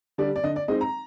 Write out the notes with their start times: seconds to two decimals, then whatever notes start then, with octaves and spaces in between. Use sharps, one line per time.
0.18 D3 G3 D5
0.36 D5
0.43 D3 D#5
0.56 D5
0.68 G#3 C4 D#4 D#5
0.81 A#5